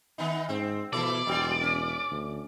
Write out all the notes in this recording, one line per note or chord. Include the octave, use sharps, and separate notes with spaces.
D#3 B3 D#4
G#2 C4
B2 E3 E4 A4 D5
E1 G#2 F#3
C#4
D2